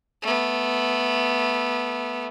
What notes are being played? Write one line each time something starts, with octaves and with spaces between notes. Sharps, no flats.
A3 B3